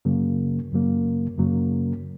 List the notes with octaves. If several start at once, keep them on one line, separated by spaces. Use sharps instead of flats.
F#2 C#3 F#3 A#3
F#2 C#3 F#3 A#3
F#2 C#3 F#3 A#3